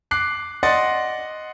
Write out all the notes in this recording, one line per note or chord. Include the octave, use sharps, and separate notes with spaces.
D6 F#6 C7
D5 D#5 F#5 C6 A6